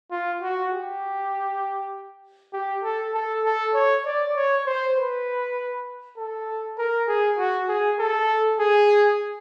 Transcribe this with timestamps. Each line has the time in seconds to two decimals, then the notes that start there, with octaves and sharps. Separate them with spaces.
0.11 F4
0.42 F#4
0.72 G4
2.53 G4
2.84 A4
3.14 A4
3.44 A4
3.74 C#5
4.05 D5
4.36 C#5
4.66 C5
4.96 B4
6.17 A4
6.78 A#4
7.08 G#4
7.38 F#4
7.69 G#4
7.99 A4
8.60 G#4